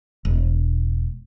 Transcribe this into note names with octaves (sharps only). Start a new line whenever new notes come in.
E1